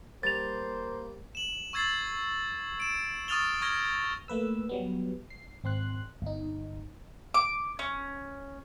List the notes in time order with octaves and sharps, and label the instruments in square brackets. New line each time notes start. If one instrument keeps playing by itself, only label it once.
[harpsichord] G3 [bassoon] A#3 [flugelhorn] C5 [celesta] A6 F7
[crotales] E7 F#7
C#6 E6 G#6 A6 C7
D7 E7
C#6 D#6 F6 A6 F7 G7
C#6 D#6 F6 G#6 A#6 G7
[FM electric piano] A3 A#3 B4 E6
F#3 G3 B3
C7
G#1 C4 C6 F#6
G1 D#4
[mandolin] D6
C#4